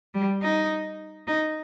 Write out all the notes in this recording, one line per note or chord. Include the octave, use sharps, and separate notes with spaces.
G3
D#4
D#4